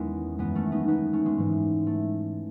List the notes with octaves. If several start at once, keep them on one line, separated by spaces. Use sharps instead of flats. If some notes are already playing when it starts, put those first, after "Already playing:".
Already playing: E2 D#3 G#3 B3 C#4 E4
F#2 E3 G#3 B3
A3 C#4
B3 D#4
B3 D#4
A3 C#4
G#3 B3
G#2 E3
A3